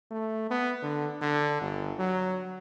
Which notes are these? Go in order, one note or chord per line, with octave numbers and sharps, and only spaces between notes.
A3
B3
D3
D3
G1
F#3